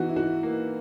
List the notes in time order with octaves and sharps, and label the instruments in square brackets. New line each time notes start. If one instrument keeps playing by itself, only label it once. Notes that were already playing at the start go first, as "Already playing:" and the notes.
Already playing: [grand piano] E3 F#4 [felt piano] B3 D#4
[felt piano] E4
[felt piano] D#4 [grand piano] F#4
[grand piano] A#3